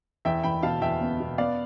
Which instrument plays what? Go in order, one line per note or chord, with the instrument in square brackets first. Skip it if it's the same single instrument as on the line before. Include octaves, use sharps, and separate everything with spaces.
[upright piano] E2 [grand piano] E5 G5
[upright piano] E2 [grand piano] G5 B5
[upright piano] B2 [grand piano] F5 A5
[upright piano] E2 [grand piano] E5 G5
[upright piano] B3
B2
[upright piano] B3 [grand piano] D5 F5